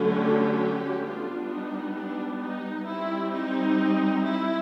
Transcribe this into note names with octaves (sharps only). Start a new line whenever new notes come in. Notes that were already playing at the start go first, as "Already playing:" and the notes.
Already playing: D3 F#3 A3 C#4
G4
G3 B3 D4 F4
D#4
D4
D#4
G3 C4 E4
D#4
E4